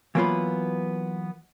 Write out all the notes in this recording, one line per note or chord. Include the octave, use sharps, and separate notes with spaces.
E3 F#3 A#3 B3 F4 B4